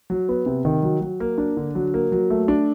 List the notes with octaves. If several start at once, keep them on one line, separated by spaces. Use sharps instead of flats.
F#3
B3
C3
D#3
F#3
F#3
A#3
D4
D3
F#3
A#3
F#3
A3
D4